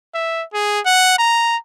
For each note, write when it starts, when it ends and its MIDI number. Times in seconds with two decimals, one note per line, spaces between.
0.14 0.44 76
0.54 0.80 68
0.86 1.18 78
1.19 1.57 82